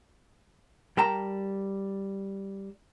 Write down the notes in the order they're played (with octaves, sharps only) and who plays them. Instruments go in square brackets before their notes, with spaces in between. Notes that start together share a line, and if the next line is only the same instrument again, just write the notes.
[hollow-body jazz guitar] G3 A#4 G5 A5 A#5